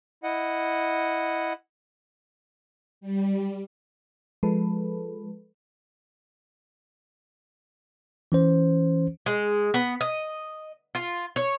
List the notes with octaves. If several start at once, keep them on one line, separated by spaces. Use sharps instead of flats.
E4 D#5 F#5
G3
F3 G#3 A4 B4
E3 C#4 C5
G#3
B3
D#5
F4
C#5